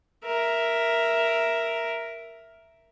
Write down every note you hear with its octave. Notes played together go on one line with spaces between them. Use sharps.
A#4 E5